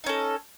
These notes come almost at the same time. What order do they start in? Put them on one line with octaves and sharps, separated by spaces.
D#4 C#4 A4